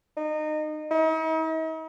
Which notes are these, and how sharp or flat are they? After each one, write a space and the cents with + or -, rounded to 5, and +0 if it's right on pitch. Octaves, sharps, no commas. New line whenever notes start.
D#4 -25
D#4 +45